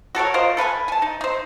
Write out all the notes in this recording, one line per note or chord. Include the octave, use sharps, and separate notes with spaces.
F#4 A4 A#4 C#5
F4 A#4 C5 D#5
A4 B4 F5 G#5
G#5 A5
D#4
D#4 C5